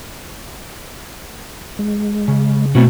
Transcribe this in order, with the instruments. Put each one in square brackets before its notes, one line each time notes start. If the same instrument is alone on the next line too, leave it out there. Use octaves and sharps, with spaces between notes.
[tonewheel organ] G#3
[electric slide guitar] C#3
[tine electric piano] B2 [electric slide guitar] A3 E4 F#4 [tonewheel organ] C4